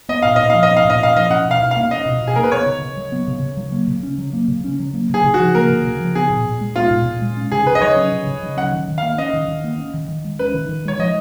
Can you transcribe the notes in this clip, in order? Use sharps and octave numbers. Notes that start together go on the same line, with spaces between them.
B3 D#5
A#2 F5
A#2 D#5
F3 F5
D#5
B3
F5
A#2
D#5
A#2 F5
F3 D#5
C#4 F#5
B2
F5
B2
F5
A#3
C#4 D#5
B2
B2
G#4
A#3 A#4
B4
B3 C#5
C#3
C#3
F#3
B3
C#3
C#3
F#3
A#3
C#3
C#4
F#3
A#3
C#3
C#4
F#3
A#3
C#3 G#4
C#3
F#4
F3
A#3 A#4
C#3
C#3
F3
B3 G#4
A#2
A#2
G#3
B3 F4
A#2
A#2
G#3
C#4
C#3 G#4
C#3 B4
D#5
F#3 C#5
C#4
C#3
C#3
F#3
C#4 F#5
D#3
D#3
F5
A#3
C#4 D#5
D#3
D#3
A#3
C#4
D#3
D#3
G#3
C#4 B4
D#3
D#3
G#3 C#5
F3 D#5